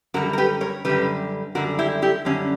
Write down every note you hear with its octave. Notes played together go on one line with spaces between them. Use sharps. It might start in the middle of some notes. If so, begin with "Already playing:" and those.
F#2 D3 G3 F#4 A#4
A#4
G4 B4
A#4 C#5
F#2 D3 G3 G4 B4
F#2 D3 G3 F#4 A#4
E4 G4
E4 G4
F#2 D3 G3 C#4